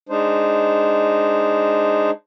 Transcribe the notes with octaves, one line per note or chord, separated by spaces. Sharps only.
G#3 D4 D#4 C5